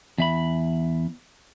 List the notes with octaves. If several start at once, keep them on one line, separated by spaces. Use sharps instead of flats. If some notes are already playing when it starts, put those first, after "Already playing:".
E2 E5 B5